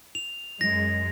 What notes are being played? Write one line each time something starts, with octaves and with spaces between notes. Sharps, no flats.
F7
F#2 G#3 A#6